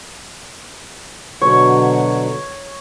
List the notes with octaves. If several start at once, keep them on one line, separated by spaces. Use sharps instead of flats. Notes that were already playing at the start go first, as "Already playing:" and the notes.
B2 D3 F#3 C#5